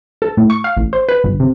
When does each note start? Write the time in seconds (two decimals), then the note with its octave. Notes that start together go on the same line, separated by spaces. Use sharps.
0.22 A4
0.37 A2
0.50 C#6
0.64 F5
0.77 A1
0.93 C5
1.09 B4
1.24 G1
1.40 C3